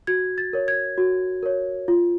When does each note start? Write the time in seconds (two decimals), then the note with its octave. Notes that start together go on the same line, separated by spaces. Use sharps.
0.07 F#4 G#6
0.38 A6
0.53 A#4 C#5
0.68 G#6
0.98 F#4
1.43 A#4 C#5
1.88 F4